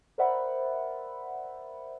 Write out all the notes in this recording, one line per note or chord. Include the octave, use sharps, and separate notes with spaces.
A#4 C5 D5 E5 F#5 B5